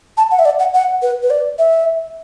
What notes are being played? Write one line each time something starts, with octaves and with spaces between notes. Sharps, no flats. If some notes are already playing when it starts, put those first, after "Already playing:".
A5
F#5
E5
D5
F#5
F#5
B4
B4
D5
E5